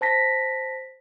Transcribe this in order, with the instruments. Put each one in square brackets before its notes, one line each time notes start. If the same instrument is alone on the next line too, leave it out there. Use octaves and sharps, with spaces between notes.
[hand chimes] C5 A5 A#6 B6